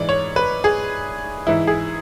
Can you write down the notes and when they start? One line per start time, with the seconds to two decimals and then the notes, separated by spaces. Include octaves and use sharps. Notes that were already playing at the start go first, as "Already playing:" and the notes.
Already playing: G#2 E3 D5
0.09 C#5
0.36 B4
0.64 G#4
1.47 G#2 E3 E4
1.67 G#4